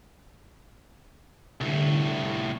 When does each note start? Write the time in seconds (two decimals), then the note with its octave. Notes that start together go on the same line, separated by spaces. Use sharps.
1.61 C2 A2 D3